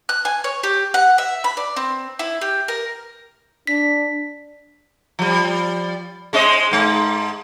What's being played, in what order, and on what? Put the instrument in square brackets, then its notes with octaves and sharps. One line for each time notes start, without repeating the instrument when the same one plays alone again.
[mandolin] F#6
G#5
C#5
G4
F#5
E5
B5
D5
C4
E4
G4
A#4
[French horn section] D4 [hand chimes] B6
[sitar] F3 G3
G#3 C4 D#5
G#2 G#3